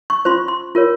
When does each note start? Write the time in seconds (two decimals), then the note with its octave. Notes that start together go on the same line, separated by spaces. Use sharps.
0.10 C#6
0.25 C#4 F4 C5 C6
0.37 C#6
0.48 C6
0.75 F4 A#4 C#5